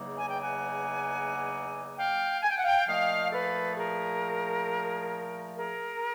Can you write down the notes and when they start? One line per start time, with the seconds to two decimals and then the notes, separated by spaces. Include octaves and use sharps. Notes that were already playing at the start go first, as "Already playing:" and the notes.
Already playing: E2 C#3 F#3 A#3 D#4
0.17 G#5
0.28 G5
0.41 F#5 G#5
1.97 F5 G5
2.43 G#5
2.49 G5
2.57 F#5
2.64 F5 G5
2.87 A#2 F3 A3 D#5 F5
3.32 A4 B4
3.77 G#4 A#4
5.57 G#4 A#4